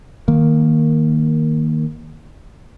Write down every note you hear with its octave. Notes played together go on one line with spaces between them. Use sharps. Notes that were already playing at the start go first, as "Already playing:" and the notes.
D#3 A#3